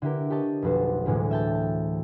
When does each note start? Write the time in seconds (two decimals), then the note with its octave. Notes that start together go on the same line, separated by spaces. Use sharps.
0.02 D3 E4 G4 A#4
0.30 G4 C#5 D#5 A5
0.62 F1 B1 F#3 F#4 C5 A6
1.06 D2 A2 E3 G#3
1.31 E5 G5 A5
1.55 A5